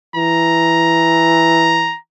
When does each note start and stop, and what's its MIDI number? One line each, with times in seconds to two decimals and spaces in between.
0.16 1.92 52
0.16 1.98 82